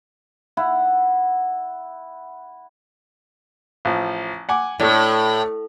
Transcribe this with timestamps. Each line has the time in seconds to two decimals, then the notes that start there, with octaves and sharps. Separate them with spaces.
0.57 E4 F#5
3.85 A1 F3
4.49 F#5 G#5 D6
4.80 A2 A3 D4